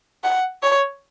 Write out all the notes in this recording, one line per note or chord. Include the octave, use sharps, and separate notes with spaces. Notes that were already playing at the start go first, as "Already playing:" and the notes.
F#5
C#5